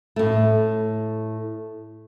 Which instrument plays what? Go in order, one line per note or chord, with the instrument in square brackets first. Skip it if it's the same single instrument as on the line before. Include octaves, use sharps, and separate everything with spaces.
[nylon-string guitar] A2 A3